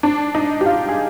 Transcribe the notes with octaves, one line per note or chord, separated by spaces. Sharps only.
D4
D#4
G4
F4
G#4